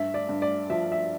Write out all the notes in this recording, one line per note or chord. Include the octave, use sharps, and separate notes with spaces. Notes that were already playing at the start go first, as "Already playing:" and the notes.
Already playing: G2 E5
D5
G2
D5
F3 E5
E5